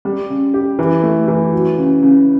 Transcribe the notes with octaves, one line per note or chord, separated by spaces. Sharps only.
G3
C#3
G4
E3
A3
E3
F#3
C#3
C#3